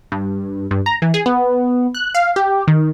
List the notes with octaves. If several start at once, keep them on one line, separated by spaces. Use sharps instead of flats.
G2
G2
A#5
E3
G#4
B3
F#6
F5
G4
D#3